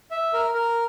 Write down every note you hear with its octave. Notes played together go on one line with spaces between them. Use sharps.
E5
A#4
A#4